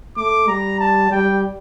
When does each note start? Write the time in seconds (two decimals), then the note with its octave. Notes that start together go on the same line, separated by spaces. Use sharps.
0.17 A3 D6
0.47 G3 A#5
0.80 A5
1.11 G3 G5